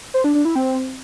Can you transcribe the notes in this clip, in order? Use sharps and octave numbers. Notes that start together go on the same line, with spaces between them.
C5
D4
D4
E4
C4